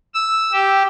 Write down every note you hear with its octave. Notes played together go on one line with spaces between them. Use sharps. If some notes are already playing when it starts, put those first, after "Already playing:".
E6
G4